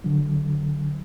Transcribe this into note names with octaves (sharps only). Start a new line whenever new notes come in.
D3 F#3